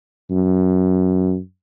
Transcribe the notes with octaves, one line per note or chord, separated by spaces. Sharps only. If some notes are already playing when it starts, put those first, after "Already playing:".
F#2